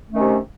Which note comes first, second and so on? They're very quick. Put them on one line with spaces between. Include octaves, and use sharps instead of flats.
A3 C#4 D#3 C3